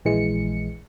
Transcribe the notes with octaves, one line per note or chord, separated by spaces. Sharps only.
A#1 E3 G#3 C#7